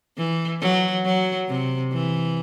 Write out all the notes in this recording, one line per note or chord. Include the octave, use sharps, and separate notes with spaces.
E3
F#3
F#3
C3
E3